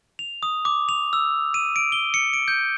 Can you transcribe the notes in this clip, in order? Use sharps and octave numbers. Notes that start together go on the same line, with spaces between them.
F7
D#6
D6
F7
E6
D#7
D7
G7
C#7
D7
G6